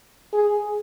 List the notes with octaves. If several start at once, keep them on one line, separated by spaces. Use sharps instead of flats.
G#4